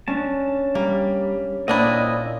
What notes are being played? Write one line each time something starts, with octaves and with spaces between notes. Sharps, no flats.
C#4 D4 A5
G3 A#3
A#2 C4 D4 E4 D#5